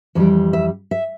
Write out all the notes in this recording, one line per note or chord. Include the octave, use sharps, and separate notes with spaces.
F2 E3 G3 D5
E5
E5